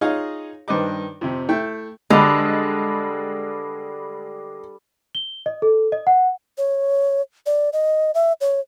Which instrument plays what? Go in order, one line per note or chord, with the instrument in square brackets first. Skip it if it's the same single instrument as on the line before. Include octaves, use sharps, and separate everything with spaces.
[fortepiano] D#4 F4 G#4 C#5 D#5 F5
G2 D#3 B4 C5 D#5 D6
F2 C3
A3 E4 G5
[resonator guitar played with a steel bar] D3 [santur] G3 B4 A5 [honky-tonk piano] G#3
[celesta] G7
D#5
A4
D#5
F#5
[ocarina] C#5
D5
D#5
E5
C#5